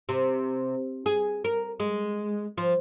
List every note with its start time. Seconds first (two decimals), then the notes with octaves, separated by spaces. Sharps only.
0.09 C3
1.06 G#4
1.44 A#4
1.80 G#3
2.58 F3